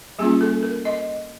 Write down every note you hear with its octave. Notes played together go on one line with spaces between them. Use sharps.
G3 A#3 C#4 F4 G#4
A4
A#4
D#5